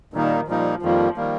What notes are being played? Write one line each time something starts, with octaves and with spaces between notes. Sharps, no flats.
A#2 D#3 G3 A#3 D#4
A#2 F3 G3 A#3 D#4
F2 D#3 F3 G3 A#3
D#3 G3 A#3